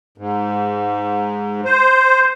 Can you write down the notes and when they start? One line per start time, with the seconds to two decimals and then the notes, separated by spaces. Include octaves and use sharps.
0.18 G#2
1.65 C5